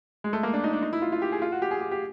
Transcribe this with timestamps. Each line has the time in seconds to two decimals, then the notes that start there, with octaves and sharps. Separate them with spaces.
0.24 G#3
0.33 A3
0.43 A#3
0.54 D4
0.64 D#4
0.73 D4
0.82 D#4
0.93 E4
1.02 F4
1.12 F4
1.22 G4
1.32 G#4
1.42 F4
1.52 F#4
1.62 G4
1.71 G#4
1.81 G4
1.92 G4